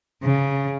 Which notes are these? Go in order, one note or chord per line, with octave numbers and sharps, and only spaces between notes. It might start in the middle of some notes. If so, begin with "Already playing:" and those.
C#3